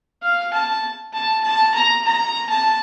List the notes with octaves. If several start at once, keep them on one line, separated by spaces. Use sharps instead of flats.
F5
A5
A5
A5
A#5
A#5
A5